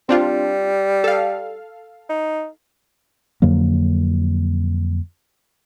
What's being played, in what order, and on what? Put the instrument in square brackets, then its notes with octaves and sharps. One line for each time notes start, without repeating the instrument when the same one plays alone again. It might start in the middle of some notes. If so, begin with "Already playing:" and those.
[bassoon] G3 [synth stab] C4 D4 F4
[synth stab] A4 F5
[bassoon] D#4
[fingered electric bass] F2 D3 F#3 A#3